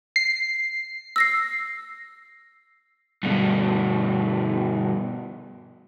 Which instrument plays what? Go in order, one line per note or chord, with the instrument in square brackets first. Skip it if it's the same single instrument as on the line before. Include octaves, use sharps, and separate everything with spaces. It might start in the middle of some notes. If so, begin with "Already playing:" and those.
[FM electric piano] C7
[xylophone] E6 A#6 C7
[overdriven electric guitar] G2 B2